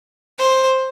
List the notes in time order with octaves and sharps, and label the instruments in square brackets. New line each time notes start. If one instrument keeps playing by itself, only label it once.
[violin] C5